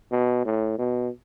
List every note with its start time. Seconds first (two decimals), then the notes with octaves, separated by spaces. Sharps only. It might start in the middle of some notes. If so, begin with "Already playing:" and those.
0.12 B2
0.46 A2
0.78 B2